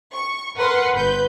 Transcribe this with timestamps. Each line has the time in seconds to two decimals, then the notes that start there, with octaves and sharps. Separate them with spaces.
0.13 C#6
0.57 A#4 B4 F#5 C6
0.94 G1 B4 G6